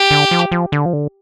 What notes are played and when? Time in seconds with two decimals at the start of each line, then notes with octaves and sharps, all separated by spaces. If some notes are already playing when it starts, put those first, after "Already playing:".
Already playing: G4
0.11 D3
0.31 F3
0.52 F3
0.72 D3
0.86 F3
0.93 D3